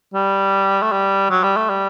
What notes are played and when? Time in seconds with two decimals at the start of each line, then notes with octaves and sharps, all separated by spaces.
0.14 G3
0.82 A3
0.92 G3
1.30 F#3
1.44 G3
1.56 A3
1.69 G3